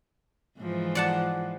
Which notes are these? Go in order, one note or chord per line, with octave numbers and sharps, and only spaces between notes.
G#2 E3 F3
D5 F#5 A5